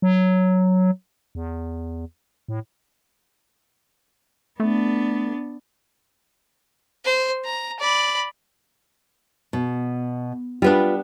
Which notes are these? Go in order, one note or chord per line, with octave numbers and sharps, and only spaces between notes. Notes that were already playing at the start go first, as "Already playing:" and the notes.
F#3
E2
A2
A3 B3 D4
C5
A#5
D5 B5
B2
G3 B3 D4 F4 B4